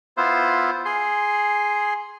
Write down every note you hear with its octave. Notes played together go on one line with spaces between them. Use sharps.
B3 E4 F4 C5
G#4 C6